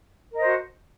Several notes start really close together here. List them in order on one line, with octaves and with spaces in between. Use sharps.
A#4 D#5 C5 F#4